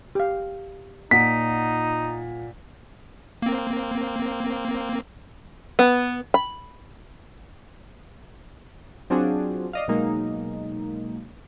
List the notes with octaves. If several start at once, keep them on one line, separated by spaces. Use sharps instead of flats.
G4 F5
A#2 D#4 F#5 B6
A#3 C4
B3
B5
F#3 C4 D4 F4 F#4 G#4
D5 D#5 F5
B2 F#3 G#3 A#3 D#4